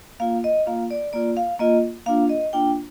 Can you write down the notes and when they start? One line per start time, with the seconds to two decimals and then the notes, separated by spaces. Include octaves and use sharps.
0.20 A#3 F4 F5
0.44 D#5
0.67 A#3 F4 F5
0.91 D5
1.13 A#3 F4 D5
1.37 F5
1.60 A#3 F4 D#5
2.06 A#3 D4 F4 F5
2.29 D#5
2.53 A#3 D4 F4 G5